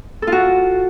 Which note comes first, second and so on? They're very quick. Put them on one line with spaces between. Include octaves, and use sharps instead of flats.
A4 F4 F#4